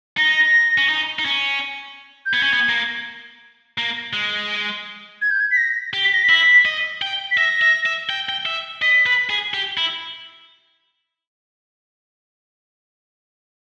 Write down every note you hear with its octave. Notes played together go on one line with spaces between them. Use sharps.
D#4 A#6
C#4
D#4
D#4
C#4
G6
B3 G#6
C#4
B3
A#3
A#3
G#3
G#6
G6
G#6
B6
A#6
G4
B6
A#6
B6
E4
D#5
G5
B6
E5 A#6
E5
E5
G5
G5
E5
D#5 B6
B4
G#4
G4
E4